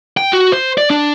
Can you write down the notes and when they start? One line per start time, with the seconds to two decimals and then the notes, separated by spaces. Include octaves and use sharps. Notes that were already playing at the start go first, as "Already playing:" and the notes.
0.17 G5
0.33 F#4
0.52 C5
0.78 D5
0.90 D4